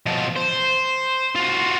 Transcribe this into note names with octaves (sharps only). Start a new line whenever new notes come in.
B2 F3
C5
F4 F#4